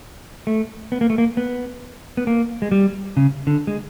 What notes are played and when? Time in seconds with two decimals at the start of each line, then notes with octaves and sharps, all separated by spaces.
0.47 A3
0.92 B3
1.01 A#3
1.10 A3
1.18 A#3
1.37 B3
2.17 B3
2.27 A#3
2.62 G#3
2.72 G3
3.17 C#3
3.47 D3
3.67 G#3